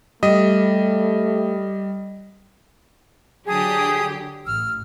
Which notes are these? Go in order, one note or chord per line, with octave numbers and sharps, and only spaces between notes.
G3 A3 D#5 D#6
D3 F#3 G4 G#4 A5 D#6
A1 E6 F6